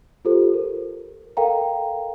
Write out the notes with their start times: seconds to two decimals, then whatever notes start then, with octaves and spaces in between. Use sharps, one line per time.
0.25 F4 G4 A4 C5
0.54 A#4
1.37 A4 A#4 D#5 F5 G5 A#5